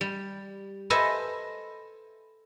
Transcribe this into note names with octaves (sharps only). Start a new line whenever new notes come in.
G3
A4 B4 C5 D#5 E5 G#5